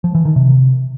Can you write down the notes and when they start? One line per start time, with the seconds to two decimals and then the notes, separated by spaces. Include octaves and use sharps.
0.04 F3
0.15 E3
0.25 D#3
0.36 C3